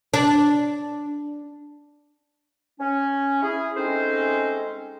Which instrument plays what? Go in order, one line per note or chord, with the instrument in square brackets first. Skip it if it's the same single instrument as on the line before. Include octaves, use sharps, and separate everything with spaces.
[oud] D4
[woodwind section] C#4
E4 G#4
G#3 A3 C4 C#4 D#4 C5